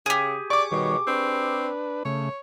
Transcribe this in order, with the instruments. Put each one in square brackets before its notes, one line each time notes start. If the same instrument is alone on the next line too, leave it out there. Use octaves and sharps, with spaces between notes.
[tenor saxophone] C#3 [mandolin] G4 G#4
[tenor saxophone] D5 [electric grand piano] C#6 D6
[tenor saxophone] B2 [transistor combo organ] D#3 G3 C#5
[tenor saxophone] C4 [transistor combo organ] D4 B4
[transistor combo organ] C#3 A3 [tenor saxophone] C#5